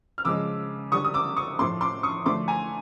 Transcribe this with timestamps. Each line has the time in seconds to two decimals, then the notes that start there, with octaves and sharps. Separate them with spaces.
0.18 F6
0.25 C#3 F3 G#3 D6 E6
0.92 D3 G3 C#6 D#6
1.05 D#6
1.14 D6 E6
1.36 C#6 D#6
1.59 A2 F3 A3 C6 D6
1.81 C6 D6
2.03 C#6 D#6
2.26 D3 F3 A3 C6 D6
2.48 G#5 A#5